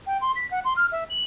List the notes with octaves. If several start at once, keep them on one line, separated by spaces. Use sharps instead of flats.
G5
C6
B6
F#5
C6
F6
E5
F#7